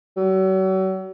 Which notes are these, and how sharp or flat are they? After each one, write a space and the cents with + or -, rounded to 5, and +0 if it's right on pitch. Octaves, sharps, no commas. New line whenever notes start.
F#3 +40